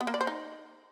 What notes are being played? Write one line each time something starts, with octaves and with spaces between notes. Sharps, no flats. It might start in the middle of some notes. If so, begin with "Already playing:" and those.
B3
A#3
D5
C5
D#4